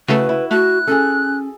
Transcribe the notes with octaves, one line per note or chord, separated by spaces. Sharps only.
C#3 A3 E4 F#4 B4
E4
A3 F#4 F#6
C#4 G#4 A4